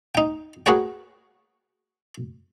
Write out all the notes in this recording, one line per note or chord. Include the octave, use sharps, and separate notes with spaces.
D#4 G5
F#4 G#4 A#4 B4 C#5 G5